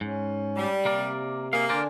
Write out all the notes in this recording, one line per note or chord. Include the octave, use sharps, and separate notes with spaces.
G#2 C#4
G3
C3 A#3 A#4 D5
A#3 G#4 F5
D3 D4 A#4 C5 D5 G#5